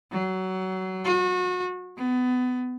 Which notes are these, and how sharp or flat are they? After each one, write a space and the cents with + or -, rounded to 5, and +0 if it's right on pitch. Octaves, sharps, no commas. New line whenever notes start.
F#3 +20
F#4 -35
B3 +25